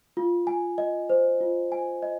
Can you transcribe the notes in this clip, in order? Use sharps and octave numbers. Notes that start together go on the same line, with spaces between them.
F4
G#5
D#5
C5
F4
G#5
D#5